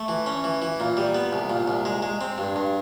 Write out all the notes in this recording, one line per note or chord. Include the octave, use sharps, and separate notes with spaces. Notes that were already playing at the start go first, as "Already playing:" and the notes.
Already playing: A3
E3
C#4
E3
E3
A#2
G3
B3
C2
A#2
C2
G#3
G#3
C4
G2
G2